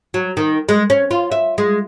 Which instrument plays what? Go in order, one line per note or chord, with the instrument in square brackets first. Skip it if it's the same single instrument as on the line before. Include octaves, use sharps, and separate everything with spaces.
[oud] F#3
D#3
G#3
C#4
F4
E5
G#3